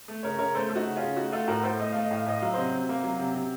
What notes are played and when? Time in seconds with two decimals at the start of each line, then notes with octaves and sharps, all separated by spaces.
0.08 A3
0.23 C#3 A#4 C#5
0.39 C#3 A#4 C#5
0.55 A3 A4 C5
0.69 A3 A4
0.75 D#4 F#4
0.85 C#3
0.96 C#4 F4
1.02 C#3
1.16 A3 D#4 F#4
1.32 A3 F4 A4
1.48 A2 F#4 A#4
1.63 A2 A4 C5
1.79 A3 D#5
1.92 A3 F5
2.04 D#5
2.11 A2
2.16 F5
2.27 A2 D#5
2.42 F#3 F5
2.54 C3 C5 D#5
2.73 C3
2.89 A#3
3.03 F#3
3.19 C3
3.35 C3